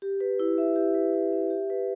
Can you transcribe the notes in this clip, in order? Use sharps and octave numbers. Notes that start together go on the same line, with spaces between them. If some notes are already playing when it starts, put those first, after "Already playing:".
G4
B4
E4
E5
G4
B4
E4
E5
G4
B4